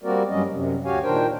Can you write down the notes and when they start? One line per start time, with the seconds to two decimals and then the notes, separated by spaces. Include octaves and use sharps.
0.03 G3 A#3 C4 F#4 A#4 D5
0.30 G2 F#3 G3 C#4 D#5
0.49 F#2 C3
0.85 D2 F#4 G4 C#5 F5 G#5
1.03 A#2 D#3 D4 A#4 C5 G5